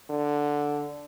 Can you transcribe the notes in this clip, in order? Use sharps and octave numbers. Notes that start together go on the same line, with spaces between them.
D3